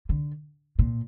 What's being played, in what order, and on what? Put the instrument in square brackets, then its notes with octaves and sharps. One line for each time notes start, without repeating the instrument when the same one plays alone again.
[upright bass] D3
A#2